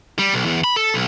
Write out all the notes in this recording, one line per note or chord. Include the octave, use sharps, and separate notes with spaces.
G3
B1
E2
B5
A4
B1